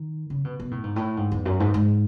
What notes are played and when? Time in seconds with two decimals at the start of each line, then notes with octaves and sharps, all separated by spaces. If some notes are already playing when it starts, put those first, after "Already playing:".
Already playing: D#3
0.30 C#3
0.45 B2
0.60 B2
0.71 A2
0.84 G#2
0.96 A2
1.17 G#2
1.32 E2
1.45 F#2
1.60 G#2
1.74 G#2